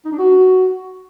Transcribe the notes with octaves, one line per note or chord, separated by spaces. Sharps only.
D#4
D4
F#4